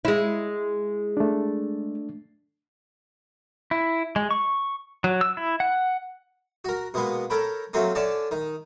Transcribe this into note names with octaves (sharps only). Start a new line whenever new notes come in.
G#3 E4
A3 D4
E4
G#3
C#6
F#3
E6
E4
F#5
F#4 A#4
B2 G#3 A#3 B3
A4 A#4 C#5 G5 B5
F#3 A3 A#3 C4 C#4
D3 C#4 D5 A5
D#3